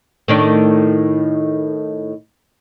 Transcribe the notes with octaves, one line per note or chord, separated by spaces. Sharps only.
A2 D#3 D4